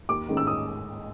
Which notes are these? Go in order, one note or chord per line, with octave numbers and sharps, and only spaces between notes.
D#2 D6
D#3 G#3 C#4
E6
D#6